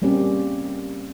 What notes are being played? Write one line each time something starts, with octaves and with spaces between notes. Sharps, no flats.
G3 A#3 C4 C#4 G4